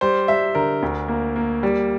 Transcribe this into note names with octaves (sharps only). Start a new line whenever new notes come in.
G3 C5
G3 E5
D3 A#4
D2
A#3
A#3
G3